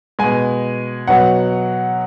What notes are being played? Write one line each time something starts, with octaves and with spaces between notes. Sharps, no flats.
B2 G#3 G#5
B2 F#3 F#5